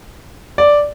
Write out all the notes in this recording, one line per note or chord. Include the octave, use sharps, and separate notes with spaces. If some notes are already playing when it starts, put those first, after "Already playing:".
D5